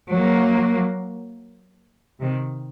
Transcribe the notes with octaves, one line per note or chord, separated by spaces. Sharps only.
F#3 A#3
C3 D#3